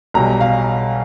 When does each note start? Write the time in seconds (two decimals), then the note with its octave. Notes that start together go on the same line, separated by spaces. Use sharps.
0.14 B1 B2 G3 A#5
0.41 F5